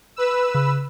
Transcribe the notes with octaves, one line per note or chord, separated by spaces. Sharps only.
B4 E6
C#3